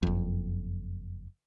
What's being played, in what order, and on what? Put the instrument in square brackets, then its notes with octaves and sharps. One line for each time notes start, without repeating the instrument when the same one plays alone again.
[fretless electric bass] F#1 F2